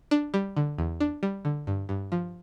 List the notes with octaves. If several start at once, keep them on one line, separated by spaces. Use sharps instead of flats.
D4
G3
D3
E2
D4
G3
D3
G2
G2
F3